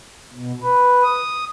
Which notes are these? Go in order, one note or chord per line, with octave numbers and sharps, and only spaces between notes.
B2
B4
D#6